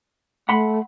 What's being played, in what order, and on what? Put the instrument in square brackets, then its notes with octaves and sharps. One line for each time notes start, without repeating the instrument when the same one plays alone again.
[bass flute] A3 [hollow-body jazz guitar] F#5 B5 C6